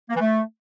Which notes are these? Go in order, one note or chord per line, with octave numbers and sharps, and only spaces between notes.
A#3
E3
A3